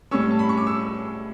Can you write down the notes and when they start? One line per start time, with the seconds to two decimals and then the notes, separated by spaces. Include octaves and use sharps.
0.11 A2 G3 C#4 C#6 E6
0.31 A5
0.39 B5
0.49 C#6
0.57 D6
0.67 C#6 E6